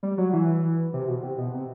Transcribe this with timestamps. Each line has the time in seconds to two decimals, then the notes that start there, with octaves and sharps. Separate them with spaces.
0.03 G3
0.18 F#3
0.33 E3
0.93 C3
1.07 B2
1.23 C3
1.38 B2
1.53 C3